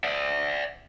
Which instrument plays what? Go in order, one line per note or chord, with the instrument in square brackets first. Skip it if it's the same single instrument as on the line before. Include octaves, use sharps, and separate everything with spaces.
[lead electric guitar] D5 E5